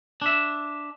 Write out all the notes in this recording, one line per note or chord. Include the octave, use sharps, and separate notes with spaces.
D4 E5